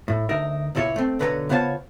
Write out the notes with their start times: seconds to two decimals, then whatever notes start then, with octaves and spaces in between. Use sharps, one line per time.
0.08 A2
0.29 D2 D#4 A#4 E5
0.75 C#2 A#2 E4 A4 C#5
0.96 A3 C4
1.19 B1 D3 B4 C#5 G5 A#5
1.49 C#3 B3 F4 C5 C#5 A5